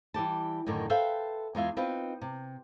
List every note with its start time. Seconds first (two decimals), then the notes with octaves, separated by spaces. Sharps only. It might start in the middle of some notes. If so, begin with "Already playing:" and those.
0.14 E3 G3 G4 A5
0.66 F#2 A2 D3 D#3
0.90 A4 B4 C5 E5 F5 G5
1.55 E2 G#3 F4 E5
1.77 C4 D#4 F4 B4
2.21 C3